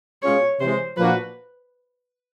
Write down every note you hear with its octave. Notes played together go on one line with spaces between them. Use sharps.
B2 G#3 C#4 F4 G#4 C#5
C3 E3 G#3 C5
A#2 F3 A#3 D4 F#4 B4